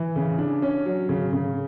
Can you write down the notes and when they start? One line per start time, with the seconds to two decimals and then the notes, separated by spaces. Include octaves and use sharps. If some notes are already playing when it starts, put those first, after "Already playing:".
Already playing: E3
0.16 C#3
0.39 D4
0.62 C#4
0.85 F#3
1.09 C#3
1.33 C#3